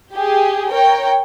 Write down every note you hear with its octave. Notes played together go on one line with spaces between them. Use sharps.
G4 G#4
A#4 C#5 G5